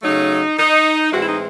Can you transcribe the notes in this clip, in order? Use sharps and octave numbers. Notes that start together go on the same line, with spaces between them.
C#3 F#3 A3 D#4
D#4
A2 E3 G#3 C4 F#4
E4
D#4